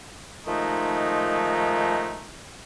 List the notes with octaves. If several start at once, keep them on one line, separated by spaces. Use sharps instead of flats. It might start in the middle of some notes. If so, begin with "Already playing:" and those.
D#3 F3 G#3 A3 D#4